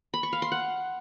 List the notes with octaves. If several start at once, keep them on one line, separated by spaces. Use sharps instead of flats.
B5
C#6
F5
C6
F#5